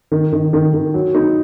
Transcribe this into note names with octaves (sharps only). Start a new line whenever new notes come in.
D#3
D#3
D#3
D#3
F#3
D#4